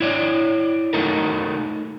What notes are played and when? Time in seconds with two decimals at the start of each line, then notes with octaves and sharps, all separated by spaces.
0.01 E4 C#5 D5
0.93 A3 D#4 A4 A#4